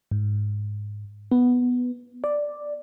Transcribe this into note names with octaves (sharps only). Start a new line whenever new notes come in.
G#2
B3
D5